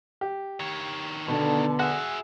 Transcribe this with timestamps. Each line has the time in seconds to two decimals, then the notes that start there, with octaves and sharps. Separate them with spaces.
0.21 G4
0.60 D#3 C#5
1.28 B2 D3 B3 A5
1.79 F#4 G#4 E5 F#5